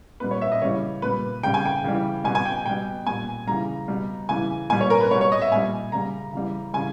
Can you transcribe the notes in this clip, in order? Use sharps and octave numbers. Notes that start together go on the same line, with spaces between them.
A#2 G3 B4
C#5
E5
D#5
C#3 E3 G3 C#5
A#2 G3 B4
C#3 G3 G5
G#5
G5
C#3 E3 G3
B2 G3 G#5
G#5
G5
B2 G3 G5
A#2 G3 G#5
C#3 E3 G3 A#5
B2 G3
C#3 E3 G3 G#5
A#2 G3 G#5
C#5
A#4
B4
B2 G3 C#5
C#5
D#5
E5
A#2 G3 G#5
C#3 G3 A#5
C#3 E3 G3
C#3 E3 G3 G#5